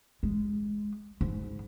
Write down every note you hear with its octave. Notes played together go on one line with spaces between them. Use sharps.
G#3
G#2